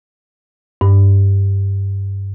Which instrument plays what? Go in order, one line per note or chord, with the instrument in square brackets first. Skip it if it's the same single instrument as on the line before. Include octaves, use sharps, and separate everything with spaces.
[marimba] G2